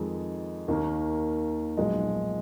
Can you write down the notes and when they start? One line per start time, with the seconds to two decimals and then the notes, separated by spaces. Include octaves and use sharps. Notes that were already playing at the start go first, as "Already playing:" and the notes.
Already playing: F2 D#3 G#3 D#4 G#4
0.68 D#2 D#3 A#3
1.77 B1 A#2 F3 G#3